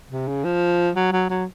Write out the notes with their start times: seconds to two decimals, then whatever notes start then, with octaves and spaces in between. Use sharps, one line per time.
0.11 C3
0.28 C#3
0.44 F3
0.96 F#3
1.12 F#3
1.30 F#3